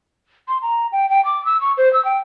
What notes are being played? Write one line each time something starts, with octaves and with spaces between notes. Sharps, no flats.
C6
A#5
G5
G5
D6
E6
C#6
C5
E6
G5